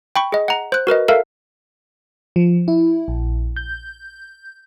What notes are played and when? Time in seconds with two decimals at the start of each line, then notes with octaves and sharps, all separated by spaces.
0.16 G5 B5 C#6
0.32 G#4 D#5
0.48 F#5 A#5
0.72 C5 F#6
0.87 F#4 A#4 B4 D#5
1.08 A4 A#4 E5 F5
2.36 F3
2.68 E4
3.08 A#1
3.56 G6